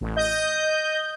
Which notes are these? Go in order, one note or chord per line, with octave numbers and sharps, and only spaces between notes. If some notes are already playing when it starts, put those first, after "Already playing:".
A1
D#5 G6